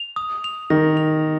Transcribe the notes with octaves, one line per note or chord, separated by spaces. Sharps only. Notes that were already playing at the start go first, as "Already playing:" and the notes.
Already playing: F7
D#6
F7
D#3 A#6
F7